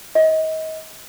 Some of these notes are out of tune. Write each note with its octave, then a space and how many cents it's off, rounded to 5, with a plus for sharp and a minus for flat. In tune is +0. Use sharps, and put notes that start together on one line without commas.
D#5 +30